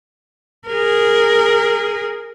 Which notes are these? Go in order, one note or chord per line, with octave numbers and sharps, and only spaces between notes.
G#4 A#4